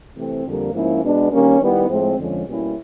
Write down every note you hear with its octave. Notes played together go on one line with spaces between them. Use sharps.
C3 E3 A3 C4
F2 D3 G3 A#3
G#2 F3 A#3 C#4 E4
B2 G#3 B3 D4
D#3 G3 A#3 C#4
D#3 G3 B3 E4
A2 F3 G#3 C4
F2 D3 F3 G#3 C#4
B2 G3 A#3 C#4 E4